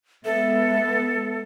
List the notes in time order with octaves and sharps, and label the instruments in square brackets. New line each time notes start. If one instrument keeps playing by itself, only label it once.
[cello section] G#3 B3 [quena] A4 [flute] E5